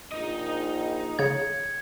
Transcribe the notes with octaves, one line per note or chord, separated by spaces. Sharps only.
A#1 D#4 D#5
C#3 C#5 G#6 C#7